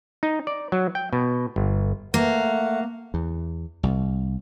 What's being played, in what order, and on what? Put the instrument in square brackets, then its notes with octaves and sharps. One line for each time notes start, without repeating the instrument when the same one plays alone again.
[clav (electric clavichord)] D#4
D5
F#3
G5
B2
G1
[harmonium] A3 F#5 [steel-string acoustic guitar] A#3
[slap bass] E2
C2